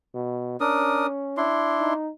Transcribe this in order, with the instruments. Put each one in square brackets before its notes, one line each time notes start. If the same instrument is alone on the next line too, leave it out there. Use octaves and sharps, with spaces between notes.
[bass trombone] B2
[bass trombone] C#4 [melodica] D4 A#4 D#6
[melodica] D4 E4 C6
[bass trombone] D#4